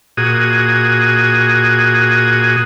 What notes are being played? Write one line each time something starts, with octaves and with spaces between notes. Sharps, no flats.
A#2 F#4 G#4 D#6